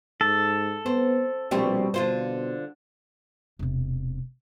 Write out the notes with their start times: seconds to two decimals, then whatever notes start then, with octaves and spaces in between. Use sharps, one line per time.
0.21 G#2 A4
0.86 B3 C4
1.51 A#1 B2 G3 C4
1.94 B2 D3 F4 C5
3.59 E1 C3